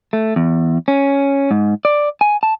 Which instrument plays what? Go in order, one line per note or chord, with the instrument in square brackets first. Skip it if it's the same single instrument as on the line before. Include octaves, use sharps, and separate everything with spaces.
[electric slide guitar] A3
E2
C#4
G#2
D5
G#5
A5